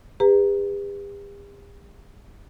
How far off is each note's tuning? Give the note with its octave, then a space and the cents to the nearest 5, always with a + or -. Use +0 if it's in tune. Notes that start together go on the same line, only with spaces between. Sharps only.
G4 +45 B4 +0 A#5 +0